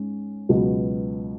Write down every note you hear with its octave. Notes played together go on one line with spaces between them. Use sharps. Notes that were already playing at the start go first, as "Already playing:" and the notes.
Already playing: G#2 G#3 C#4
C#2 B2 F#3 B3